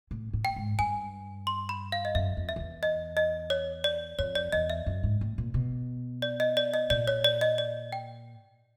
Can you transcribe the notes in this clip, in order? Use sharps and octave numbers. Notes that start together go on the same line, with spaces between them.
A2
A2
G5
G#2
G2 G#5
C6
B5
F5
D#5
F#2 E5
F2
E5
F2
E2
D#5
D#5
C#5
D5
F2 C#5
D5
E2 D#5
E5
F#2
G#2
A2
A#2
B2
D5
D#5
D5
D#5
A#2 D5
C#5
D5
D#5
D5
G5